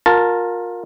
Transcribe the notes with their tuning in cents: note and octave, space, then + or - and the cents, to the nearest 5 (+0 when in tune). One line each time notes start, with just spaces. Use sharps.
F4 +30 A#4 +0 A5 +0